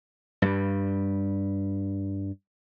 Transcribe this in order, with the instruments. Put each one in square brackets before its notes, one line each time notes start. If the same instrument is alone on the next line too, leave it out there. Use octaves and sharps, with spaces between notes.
[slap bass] G2 G3